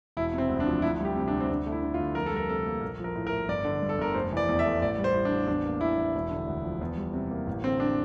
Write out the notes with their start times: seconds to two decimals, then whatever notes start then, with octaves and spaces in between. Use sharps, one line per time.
0.17 E1 E4
0.34 C3 C4
0.49 D2
0.60 D4
0.67 F3
0.82 D2 E4
1.00 G3 G4
1.16 C3
1.28 D4
1.32 D2
1.40 C4
1.49 D2 D4
1.66 A3
1.72 E4
1.83 D3
1.94 F4
1.98 D2
2.15 F2 A#4
2.26 A4
2.32 G3 A#4
2.49 C3 A4
2.66 A#3
2.82 A#1 A#4
2.99 F3 A#4
3.16 A2
3.27 A#4
3.32 A3
3.48 G1 D5
3.65 D3
3.82 G2
3.89 A4
3.98 G1 A#4
4.14 F1 C5
4.32 E3 D5
4.49 E2
4.59 E5
4.65 A3
4.82 A1 D5
4.98 G3
5.04 C5
5.15 A2
5.25 D4
5.31 A1
5.47 E2 D4
5.65 A#3
5.81 E3 E4
5.97 E2
6.15 E1
6.31 D3
6.47 D2
6.64 F3
6.81 E2
6.97 G3
7.14 C3
7.31 A#3
7.47 A1
7.64 D3 C4
7.80 D4